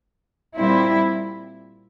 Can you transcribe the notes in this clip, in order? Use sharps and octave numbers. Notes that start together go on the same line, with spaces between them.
A#2 G3 C4 E4